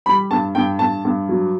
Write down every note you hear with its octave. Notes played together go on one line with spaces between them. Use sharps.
G3 B5
G2 A5
G2 G5
G2 A5
G2
F#3